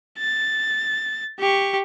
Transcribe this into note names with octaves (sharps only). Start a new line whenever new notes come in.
A6
G4 C#6